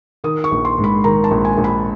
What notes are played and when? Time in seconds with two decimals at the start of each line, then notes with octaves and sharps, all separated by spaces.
0.24 D#3 D#6
0.44 C#6
0.51 A#1
0.65 C6
0.78 G#2
0.84 B5
1.04 D#3 A#5
1.24 A5
1.31 A#1
1.45 G#5
1.57 A#1
1.64 B5